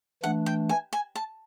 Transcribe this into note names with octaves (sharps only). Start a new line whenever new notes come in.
E3 A3 D4 F#5
G5
G#5
G#5
A5